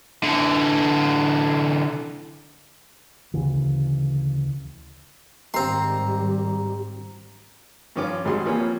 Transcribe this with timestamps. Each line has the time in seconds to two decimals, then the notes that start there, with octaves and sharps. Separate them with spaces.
0.24 D3 E3
3.34 D2 C#3 E3
5.54 G#2 D#3 G3 C4 G4 A#5 C6
7.96 G2 F3 C#4 F4 D6
8.25 G#1 G#2 G3 F#4 G#4 C6
8.45 E3 F3 G3 A#3 C#5